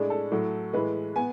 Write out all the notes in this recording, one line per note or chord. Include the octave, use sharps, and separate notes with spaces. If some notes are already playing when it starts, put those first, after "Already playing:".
Already playing: A2 G#3 D4 G#4
A4
A2 F#3 A3
A2 E3 G#3 B4
B3 G#5